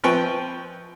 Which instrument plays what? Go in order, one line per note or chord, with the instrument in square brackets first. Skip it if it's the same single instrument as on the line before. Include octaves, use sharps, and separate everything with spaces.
[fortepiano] F3 C4 B4 G5 C#6